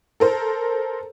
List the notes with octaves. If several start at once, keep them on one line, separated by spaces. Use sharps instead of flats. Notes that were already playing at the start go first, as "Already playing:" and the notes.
A4 A#4 C5